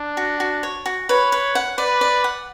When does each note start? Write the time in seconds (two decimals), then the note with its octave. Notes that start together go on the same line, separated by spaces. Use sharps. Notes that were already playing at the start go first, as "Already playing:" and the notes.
Already playing: D4
0.17 F#4
0.40 F#4
0.63 C#5
0.86 F#4
1.09 B4 C#5
1.32 B4
1.55 F#5
1.78 B4 D5
2.01 D5
2.24 F#5